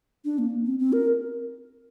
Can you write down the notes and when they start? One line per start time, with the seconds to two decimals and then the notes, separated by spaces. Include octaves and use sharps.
0.25 D4
0.39 A#3
0.66 C4
0.79 C4
0.93 A#4